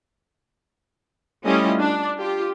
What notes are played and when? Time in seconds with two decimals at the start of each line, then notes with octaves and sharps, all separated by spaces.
1.45 G3 A3 C#4 E4 F4 D#5
1.80 D4
2.18 F4 G4